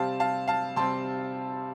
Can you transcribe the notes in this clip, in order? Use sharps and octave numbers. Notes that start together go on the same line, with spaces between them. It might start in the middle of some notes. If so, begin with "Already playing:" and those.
Already playing: C3 G3 C4 F5 A5
F5 A5
F5 A5
C3 G3 C4 A5 C6